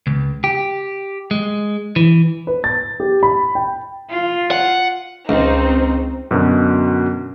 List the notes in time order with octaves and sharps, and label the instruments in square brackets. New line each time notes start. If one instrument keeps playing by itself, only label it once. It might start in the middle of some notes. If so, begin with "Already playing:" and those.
[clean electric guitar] C#2
G4
G#3
E3
[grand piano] B4
A6
G4
B5
G5
[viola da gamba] F4
[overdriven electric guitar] F#5
[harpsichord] C#2 [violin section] C4 D#4
[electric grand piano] F#2 B2 D3 F#3 C#4